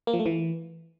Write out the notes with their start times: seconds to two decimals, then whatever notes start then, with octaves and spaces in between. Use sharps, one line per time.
0.07 A#3
0.13 F3
0.20 A3
0.26 E3